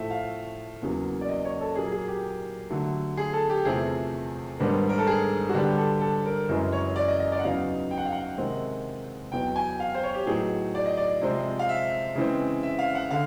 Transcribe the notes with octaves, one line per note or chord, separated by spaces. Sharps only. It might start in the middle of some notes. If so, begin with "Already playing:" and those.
Already playing: A2 F3 A3 E5
F5
E2 C#3 F#3 A#3
D5
D#5
C#5
A4
A#2 F#3 A#3 G#4
G#4
G4
D3 F#3 A3
G#4
A4
G4
E2 C3 F3 A3 G#4
G#2 D#3 G3 B3 D4
A#4
A4
G#4
F#4
D3 G3 B3 D4 G4
A4
A4
A#4
F#2 C#3 E3 G#3 C#4
C#5
D5
D#5
D#5
D5
F#5
E2 C#3 F#3 B3 D#4 F5
G5
F#5
F5
F#5
C3 D#3 G#3 C4
E2 B2 F#3 B3 G5
G#5
F5
C5
C#5
G4
A2 F#3 B3 D#4 G#4
D5
D#5
D5
C3 F3 G#3 C4
F5
E5
C#3 E3 G#3 C4
E5
F5
F#5
D3 F5